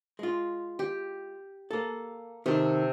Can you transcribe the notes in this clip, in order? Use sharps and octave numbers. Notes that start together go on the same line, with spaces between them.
G#3 F4
G4
A#3 A4
C3 D#3 A4